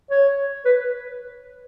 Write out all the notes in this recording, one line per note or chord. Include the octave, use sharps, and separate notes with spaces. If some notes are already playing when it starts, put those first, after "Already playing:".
C#5
B4